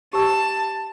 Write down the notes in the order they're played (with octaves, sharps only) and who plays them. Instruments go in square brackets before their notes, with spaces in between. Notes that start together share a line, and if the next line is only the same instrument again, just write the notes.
[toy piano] G4 C5 E6 [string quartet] A5